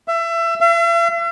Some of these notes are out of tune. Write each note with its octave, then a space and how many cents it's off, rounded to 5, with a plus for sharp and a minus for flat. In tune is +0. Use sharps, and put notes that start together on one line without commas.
E5 +25
E5 +45